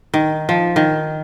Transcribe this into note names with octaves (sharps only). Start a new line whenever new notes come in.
D#3
F3
D#3